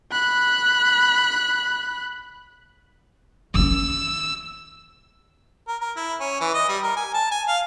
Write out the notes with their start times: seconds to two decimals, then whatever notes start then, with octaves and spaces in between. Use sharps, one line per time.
0.12 B5 F#6
3.54 D#3 C#4 E6
5.68 A#4
5.81 A#4
5.96 E4
6.20 C#4
6.41 E3
6.54 D#5
6.69 G3
6.83 A#4
6.97 G#5
7.14 A5
7.31 G#5
7.48 F5